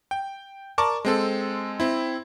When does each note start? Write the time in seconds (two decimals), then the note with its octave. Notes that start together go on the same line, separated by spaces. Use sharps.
0.11 G5
0.78 A#4 D5 A5 C#6 D6
1.05 G#3 C4 A4
1.80 C4 E4